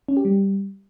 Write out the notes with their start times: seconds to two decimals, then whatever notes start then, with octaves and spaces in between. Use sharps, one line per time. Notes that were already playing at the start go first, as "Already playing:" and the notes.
0.08 C#4
0.17 G4
0.25 G3